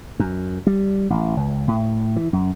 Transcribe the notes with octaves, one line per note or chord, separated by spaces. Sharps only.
F#2
G3
A1
C#2
A2
E3
F#2